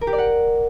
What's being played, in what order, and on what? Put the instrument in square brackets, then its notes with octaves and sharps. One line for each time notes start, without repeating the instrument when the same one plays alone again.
[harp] A#4
G4
D5
F#5